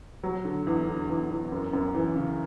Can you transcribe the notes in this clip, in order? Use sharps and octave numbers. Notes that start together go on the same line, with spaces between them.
F#3
D3
E2
D3
E2
E2
F#2
F#2
E3
C#3